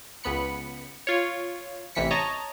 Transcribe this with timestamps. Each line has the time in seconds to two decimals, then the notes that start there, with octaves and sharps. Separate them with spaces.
0.24 C#2 B3 B5 C#7
1.07 F4 C#5
1.95 A1 C3 E3 B6 C#7
2.11 C#5 D#5 A5 A#5